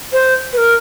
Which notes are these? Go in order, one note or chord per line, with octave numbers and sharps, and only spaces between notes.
C5
B4
A#4